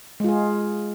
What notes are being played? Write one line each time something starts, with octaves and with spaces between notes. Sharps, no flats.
G#3 F4 G#4